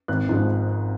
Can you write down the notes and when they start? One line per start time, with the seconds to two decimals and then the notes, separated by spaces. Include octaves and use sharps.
0.08 G#1 F#6
0.29 G#2 F3 G#3